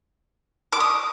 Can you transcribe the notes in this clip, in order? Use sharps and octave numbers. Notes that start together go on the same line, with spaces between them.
D6
D#6